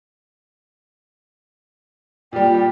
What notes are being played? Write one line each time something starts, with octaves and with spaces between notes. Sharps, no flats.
A#2 G3 G4